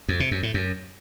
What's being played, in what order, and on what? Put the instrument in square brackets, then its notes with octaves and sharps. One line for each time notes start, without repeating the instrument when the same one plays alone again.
[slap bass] F2
C3
F#2
A2
F#2